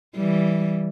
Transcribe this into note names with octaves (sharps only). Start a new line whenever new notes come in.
E3 G3